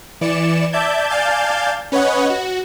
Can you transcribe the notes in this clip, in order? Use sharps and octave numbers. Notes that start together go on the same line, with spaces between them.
E3 D5 C#7 E7
D5 E5 A5 G6 G#6
D5 F5 G#5 A5 G6 A6
C#4 B4 C#5 D#5 F#5
F#4